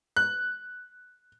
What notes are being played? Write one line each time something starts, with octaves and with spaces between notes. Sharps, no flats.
F#6